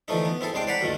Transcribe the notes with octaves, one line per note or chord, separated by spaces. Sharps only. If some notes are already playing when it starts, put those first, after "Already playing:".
D3 E3 F3 A3 D#4
B3
C4 E4 G#4 A4
C2 G#3 D4 C5 G5
C5 D5 F#5 A#5 B5
D2 G2 A#2 D#3 A#3